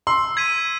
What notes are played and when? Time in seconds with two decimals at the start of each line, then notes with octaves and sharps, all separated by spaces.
0.07 C6 E6
0.37 G#6 B6 D#7